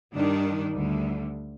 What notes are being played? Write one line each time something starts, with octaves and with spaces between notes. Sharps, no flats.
G2 D#3 G3 D4
D2 D3 G3